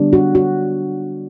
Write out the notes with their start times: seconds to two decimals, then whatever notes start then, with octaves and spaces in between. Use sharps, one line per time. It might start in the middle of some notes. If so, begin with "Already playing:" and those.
Already playing: D3 G3 B3 D4
0.13 F#4
0.35 F#4